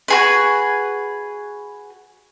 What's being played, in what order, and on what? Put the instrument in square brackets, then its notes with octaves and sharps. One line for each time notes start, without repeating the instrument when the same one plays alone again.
[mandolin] F#4 G#4 B4